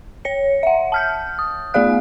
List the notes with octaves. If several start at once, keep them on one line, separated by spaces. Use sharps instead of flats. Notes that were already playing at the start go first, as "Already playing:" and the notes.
C#5 C#7
E5 F#5
A5 F6 G6
D#6
A3 B3 G#4 D5 F5 F#6